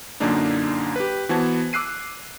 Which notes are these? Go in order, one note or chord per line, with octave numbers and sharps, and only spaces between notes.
F#2 A#2 D3 A#3 D4 D#4
G4 B4
E3 B3 F#4 C5 A5 G#6
D6 E6 F#6 C7 D#7